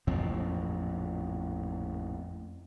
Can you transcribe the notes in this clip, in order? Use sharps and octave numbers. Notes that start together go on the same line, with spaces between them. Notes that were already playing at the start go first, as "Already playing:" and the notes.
A1 F2 A#2 C4